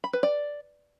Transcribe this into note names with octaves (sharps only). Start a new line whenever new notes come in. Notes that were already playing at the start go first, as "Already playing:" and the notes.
B5
B4
D5